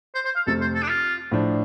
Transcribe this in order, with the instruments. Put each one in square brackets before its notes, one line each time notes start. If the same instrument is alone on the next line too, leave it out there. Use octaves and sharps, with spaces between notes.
[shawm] C5
C5
F5
[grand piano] F2 C3 A3 [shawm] A4
[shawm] C5
A4
D4
F4
[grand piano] A2 F3 D4